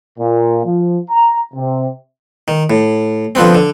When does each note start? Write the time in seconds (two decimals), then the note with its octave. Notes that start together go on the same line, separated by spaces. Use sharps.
0.19 A#2
0.65 F3
1.10 A#5
1.54 C3
2.48 D#3
2.70 A2
3.35 D3 F3 B3 C4
3.55 D3